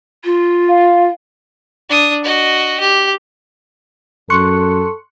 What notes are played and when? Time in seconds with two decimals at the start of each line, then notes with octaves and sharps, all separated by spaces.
0.25 F4
0.68 F5
1.90 D4 D#6
2.24 F#4 D#5
2.80 G4
4.30 F#2 A4 C6 C#6 F#6 C#7